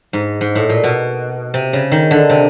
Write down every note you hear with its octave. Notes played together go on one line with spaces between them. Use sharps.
G#2
G#2
A2
A#2
B2
C3
C#3
D#3
D3
C3